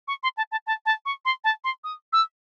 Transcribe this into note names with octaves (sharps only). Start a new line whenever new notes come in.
C#6
C6
A5
A5
A5
A5
C#6
C6
A5
C6
D#6
E6